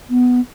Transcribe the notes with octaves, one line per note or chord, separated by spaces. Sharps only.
B3